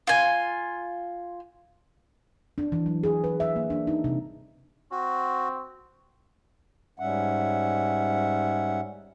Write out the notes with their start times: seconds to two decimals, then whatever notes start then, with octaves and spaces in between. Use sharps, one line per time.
0.07 F4 G#5
2.58 D4
2.72 E3
2.86 F#3
3.04 G#4
3.24 B4
3.40 E5
3.56 A#3
3.70 D4
3.87 D#4
4.04 C3
4.92 C4 F#4
7.00 G#2 G3 C#4 E5 F#5